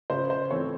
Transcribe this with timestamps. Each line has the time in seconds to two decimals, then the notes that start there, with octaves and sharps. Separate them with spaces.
0.10 C#3 C5
0.30 C5
0.51 E3 A3 C4 C#5